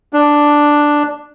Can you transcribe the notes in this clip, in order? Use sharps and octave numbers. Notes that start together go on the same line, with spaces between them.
D4